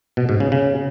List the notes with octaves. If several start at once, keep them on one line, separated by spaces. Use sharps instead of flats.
B2
G#2
C#3
C#3